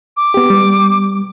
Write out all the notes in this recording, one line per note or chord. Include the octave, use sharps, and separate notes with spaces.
D6
B3 G4
G3